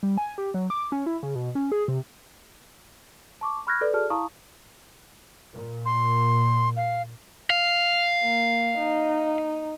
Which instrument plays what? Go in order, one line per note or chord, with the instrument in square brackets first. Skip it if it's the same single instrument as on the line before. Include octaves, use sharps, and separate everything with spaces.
[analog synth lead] G3
G#5
G4
F#3
D6
C#4
E4
C#3
B2
C#4
G#4
C3
[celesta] A5 C#6 D6
B5 C#6 F6 F#6 G#6 A#6
A4 B4 D5
F#4 G#4 A4 D5 A5 F6
E4 F5 A5 A#5 C#6 D#6
[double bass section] A#2
[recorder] C6
F5
[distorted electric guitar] F5
[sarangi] A#3
D#4